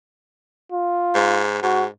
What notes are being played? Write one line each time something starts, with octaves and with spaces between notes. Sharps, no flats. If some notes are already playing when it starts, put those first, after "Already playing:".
F4
G#2
G#2 F#4